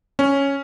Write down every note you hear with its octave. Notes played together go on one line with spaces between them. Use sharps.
C#4